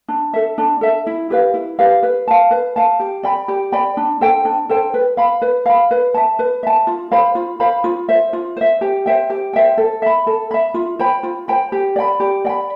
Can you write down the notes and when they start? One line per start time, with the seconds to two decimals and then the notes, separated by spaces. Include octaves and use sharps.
0.09 D4
0.33 A4 E5
0.58 D4
0.81 A4 E5
1.07 E4
1.30 G4 B4 F5
1.54 E4
1.79 G4 B4 F5
2.03 B4
2.28 F5 A5
2.51 B4
2.76 F5 A5
3.00 G4
3.23 D5 G5 B5
3.48 G4
3.72 D5 G5 B5
3.97 D4
4.21 A4 C5 G5
4.45 D4
4.69 A4 C5 G5
4.94 B4
5.17 F5 B5
5.42 B4
5.66 F5 B5
5.91 B4
6.14 E5 A5
6.39 B4
6.63 E5 A5
6.87 F4
7.11 C5 F5 B5
7.35 F4
7.60 C5 F5 B5
7.84 F4
8.09 C5 E5
8.33 F4
8.57 C5 E5
8.81 G4
9.06 C5 E5 G5
9.30 G4
9.53 C5 E5 G5
9.78 A4
10.02 E5 B5
10.27 A4
10.51 E5 B5
10.74 F4
10.99 C5 G5 B5
11.23 F4
11.48 C5 G5 B5
11.72 G4
11.96 D5 G5 B5
12.20 G4
12.45 D5 G5
12.49 B5